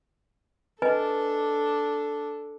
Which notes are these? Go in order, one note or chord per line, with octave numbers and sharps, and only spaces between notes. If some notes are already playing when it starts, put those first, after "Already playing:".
D4 A4 B4 D#5 G#5